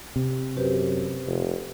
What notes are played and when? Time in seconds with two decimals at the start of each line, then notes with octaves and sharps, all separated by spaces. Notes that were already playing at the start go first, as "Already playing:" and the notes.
0.16 C3
0.57 F#2 G4 B4 C5
1.26 F1